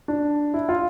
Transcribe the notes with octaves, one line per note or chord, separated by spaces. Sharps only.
D4
E4
F4